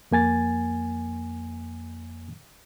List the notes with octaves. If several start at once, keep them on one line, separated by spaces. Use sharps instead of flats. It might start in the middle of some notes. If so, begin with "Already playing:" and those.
F2 A#3 G#5 A6